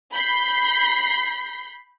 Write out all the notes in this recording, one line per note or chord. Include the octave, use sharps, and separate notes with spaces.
B5 G6 B6 C7